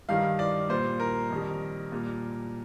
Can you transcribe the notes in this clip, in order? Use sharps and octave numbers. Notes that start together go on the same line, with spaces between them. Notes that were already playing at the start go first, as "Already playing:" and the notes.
G2 D#3 G3 F5
D5
A#2 G3 C5
A#4
F2 D#3 G3
A#2 G3